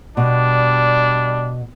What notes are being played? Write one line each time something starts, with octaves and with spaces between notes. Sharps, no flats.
B2 G3 D4